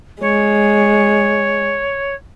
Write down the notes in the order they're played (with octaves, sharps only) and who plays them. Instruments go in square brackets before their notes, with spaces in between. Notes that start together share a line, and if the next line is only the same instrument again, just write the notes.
[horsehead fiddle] G#3 [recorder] C#5